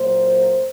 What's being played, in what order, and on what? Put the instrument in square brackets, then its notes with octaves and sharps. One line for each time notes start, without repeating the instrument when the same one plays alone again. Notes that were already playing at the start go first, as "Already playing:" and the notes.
Already playing: [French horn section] A#2 F#3 A#3 C5